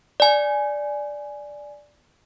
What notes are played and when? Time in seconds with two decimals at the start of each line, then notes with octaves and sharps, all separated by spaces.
0.20 D5 G#5